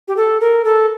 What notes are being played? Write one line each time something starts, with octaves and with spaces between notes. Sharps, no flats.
G4
A4
A#4
A4